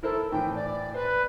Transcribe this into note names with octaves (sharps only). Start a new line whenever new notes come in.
E4 A4 A#4 C5
A2 E3 G5
D5
B4 C5